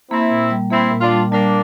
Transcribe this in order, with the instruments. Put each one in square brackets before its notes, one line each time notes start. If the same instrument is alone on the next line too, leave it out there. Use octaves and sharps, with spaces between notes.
[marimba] A#3 [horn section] C4 E4
[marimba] A#2
G3
[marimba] A#3 [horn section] C4 E4
[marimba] A#2
[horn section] D4 F4
[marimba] G3
[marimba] G3 [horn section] A#3 D4